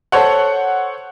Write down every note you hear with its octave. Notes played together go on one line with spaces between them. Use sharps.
A4 C5 C#5 F#5